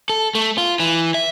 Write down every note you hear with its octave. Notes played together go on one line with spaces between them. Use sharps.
A4
A3
F4
E3
E5